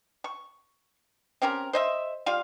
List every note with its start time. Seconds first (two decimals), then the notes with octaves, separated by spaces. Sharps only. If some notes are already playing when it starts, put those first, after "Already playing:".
0.24 C#6
1.42 C4 C#4 G4 A#4
1.73 C5 D#5 E5
2.26 G3 F4 F5